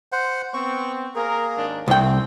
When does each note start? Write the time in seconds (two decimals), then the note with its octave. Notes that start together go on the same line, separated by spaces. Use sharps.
0.12 C5 F#5
0.53 B3 C4 C#6
1.16 A#3 G#4 A#4
1.56 G#1 D#2 D4
1.88 C2 G3 A3 C4 G5